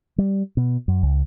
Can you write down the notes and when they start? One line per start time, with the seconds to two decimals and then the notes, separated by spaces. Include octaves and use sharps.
0.18 G3
0.57 B2
0.88 F#2
1.03 C#2